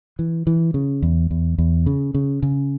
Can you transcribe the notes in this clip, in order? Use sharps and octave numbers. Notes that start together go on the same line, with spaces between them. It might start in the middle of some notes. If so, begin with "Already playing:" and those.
E3
E3
C#3
E2
E2
E2
C#3
C#3
C#3